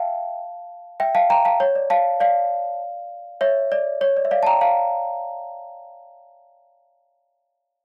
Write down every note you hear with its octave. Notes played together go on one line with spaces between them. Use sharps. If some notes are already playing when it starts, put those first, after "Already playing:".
Already playing: E5 F5 G5 A5
E5 G5
F5 A5
G5 A#5
F5 A5
C#5
D5
F5 A5
D5 F5
C#5 E5
D5
C#5
D5
E5
D5 F5
A5
G5 A#5
F5 A5